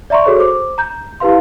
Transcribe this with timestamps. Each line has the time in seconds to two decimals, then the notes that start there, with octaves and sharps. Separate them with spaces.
0.10 D5 E5 A#5 C6 C#6
0.26 F#4 G#4 A4 C#5
0.38 C5 D6
0.78 A#5 G6
1.20 E4 G4 B4 F5 C6